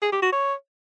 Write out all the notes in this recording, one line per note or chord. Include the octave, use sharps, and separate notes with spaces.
G#4
G4
F#4
C#5